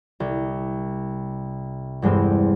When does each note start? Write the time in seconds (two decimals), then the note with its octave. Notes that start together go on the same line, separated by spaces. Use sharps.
0.20 C2
2.02 E2 G2 G#3 C4